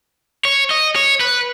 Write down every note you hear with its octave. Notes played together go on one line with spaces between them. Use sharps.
C#5
D#5
C#5
B4